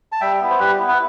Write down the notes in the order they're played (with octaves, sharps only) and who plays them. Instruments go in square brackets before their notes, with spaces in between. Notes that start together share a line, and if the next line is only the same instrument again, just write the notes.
[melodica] A5
G3 E5 G5
B3 E4
C5
G3 G4 B4
B3 E4
B4